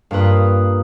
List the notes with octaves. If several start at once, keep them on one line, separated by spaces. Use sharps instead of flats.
G2 A#3 F4 B4 D#6